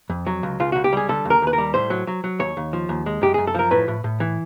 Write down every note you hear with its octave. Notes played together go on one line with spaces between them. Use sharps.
F2
F#3
C#2
C#2 F4
C#2 F#4
G4
G3 G#4
D3 A4
D#2 A#4
D#2 B4
A#4
G3
A2 C5
F#3
F#3
F#3
D#2 C#5
D#2
F3
D#2
G#3
F#2 G4
F#2 G#4
A4
F3 A#4
A2 B4
A2
A2
E3